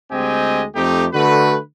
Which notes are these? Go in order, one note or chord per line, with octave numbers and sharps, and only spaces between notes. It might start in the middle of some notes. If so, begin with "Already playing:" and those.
D2 G#3 C4 G4 D#5 G#5
F2 A3 C4 D#4 G4
D3 A3 F#4 B4